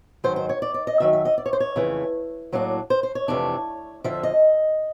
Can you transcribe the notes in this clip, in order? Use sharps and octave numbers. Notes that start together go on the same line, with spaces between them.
G#2 D#3 F#3 C5
C5
C#5
D5
D5
D#5
F#2 D#3 F#3 E5
E5
D#5
D5
C#5
C5
C#5
F2 C#3 E3 A3
A2 F#3 A#3 D4
C5
C5
C#5
F2 C3 E3 A3 D4
F2 D3 F3 E5
D#5